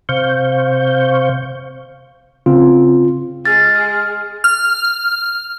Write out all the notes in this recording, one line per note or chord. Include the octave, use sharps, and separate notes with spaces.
C3 C5 F5 C#6 G6
C#3 C4 F4
G#3 G#4 F6 A6
F6